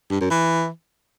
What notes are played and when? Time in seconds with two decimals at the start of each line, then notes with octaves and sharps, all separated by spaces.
0.11 G2
0.21 F#2
0.30 E3